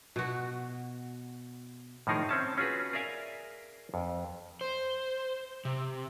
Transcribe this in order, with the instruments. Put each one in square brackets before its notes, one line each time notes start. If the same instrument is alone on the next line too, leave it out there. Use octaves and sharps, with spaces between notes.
[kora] B2 F#4
[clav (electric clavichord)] A2 D#3 F3 D#4 G#4 A#4
C4 C#4 A5
C#4 F4 F#4 G#4 B4
G#4 A#4 D5 E5 F5 G#5
F2
[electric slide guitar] C5
C3